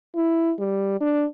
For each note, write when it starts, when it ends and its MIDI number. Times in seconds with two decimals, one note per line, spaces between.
0.16 0.52 64
0.59 0.99 55
1.00 1.25 62